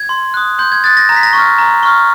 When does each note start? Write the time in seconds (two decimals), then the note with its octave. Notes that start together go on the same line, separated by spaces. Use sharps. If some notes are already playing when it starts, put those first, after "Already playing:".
Already playing: G#6
0.09 C6
0.34 D#6 F#6
0.59 C6 G6
0.72 G#6
0.84 D#6 F#6 A6
0.97 A#6
1.09 A#5 A#6
1.16 B6
1.23 A#6
1.33 C#6 F6
1.58 A#5
1.83 C#6 F6